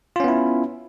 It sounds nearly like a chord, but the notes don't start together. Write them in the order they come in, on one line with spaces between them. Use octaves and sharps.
F4 C#4 B3 E4